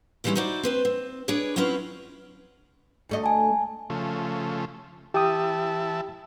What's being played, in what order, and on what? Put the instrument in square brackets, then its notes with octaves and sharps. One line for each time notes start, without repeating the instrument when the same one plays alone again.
[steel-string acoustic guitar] D#3 E3 G3 G#3 C#4 E4
D#4 E4 F#4 C5 D5
C4 B4 C5
C4
D4 G#4 B4 C#5 D5
F#3 C4 C#4 E4 F4 B4
[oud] D2 A3 D#5
[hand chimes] G#5 A5
[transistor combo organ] C#3 F3 A3
[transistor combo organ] E3 E5 A5 [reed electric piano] G4 G5 D#6